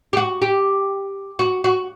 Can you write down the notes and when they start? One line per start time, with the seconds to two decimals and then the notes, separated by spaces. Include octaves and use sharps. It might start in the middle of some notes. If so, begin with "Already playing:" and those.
0.13 G4
0.17 F#4
0.42 G4
1.39 F#4
1.64 F#4